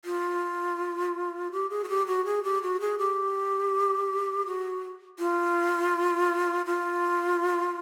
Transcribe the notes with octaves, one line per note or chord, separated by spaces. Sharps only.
F4
G4
G#4
F#4
G4
F#4
G#4
G4
F#4
G#4
G4
F#4
F4
F4